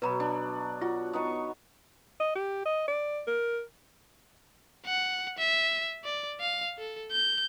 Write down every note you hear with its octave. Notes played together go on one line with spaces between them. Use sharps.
B2 F#3 B4 A#5 B5
D4
F4 F#4
B3 D#4 C#6
D#5
G4
D#5
D5
A#4
F#5
E5
D5
F5
A4
G6